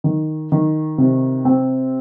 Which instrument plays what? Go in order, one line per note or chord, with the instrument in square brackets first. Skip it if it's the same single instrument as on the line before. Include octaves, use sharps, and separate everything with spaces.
[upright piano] D#3
D#3
C3
C4